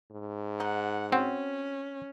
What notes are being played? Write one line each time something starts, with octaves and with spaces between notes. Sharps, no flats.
G#2
D#4 F#5
C4 C#4 F#4 F#5